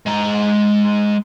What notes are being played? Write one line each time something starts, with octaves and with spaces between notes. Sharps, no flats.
G#3 A#5